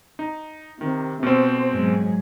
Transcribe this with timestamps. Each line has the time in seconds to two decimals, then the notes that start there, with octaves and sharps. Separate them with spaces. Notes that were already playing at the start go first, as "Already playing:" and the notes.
0.19 D#4
0.81 C3 D#3
1.23 B2 C4 C5
1.73 G#2 F#3 G#4